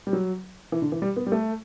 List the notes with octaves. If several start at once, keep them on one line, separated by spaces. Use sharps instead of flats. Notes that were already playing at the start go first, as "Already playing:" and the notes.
G3
F#3
E3
D3
E3
G3
B3
G3
A3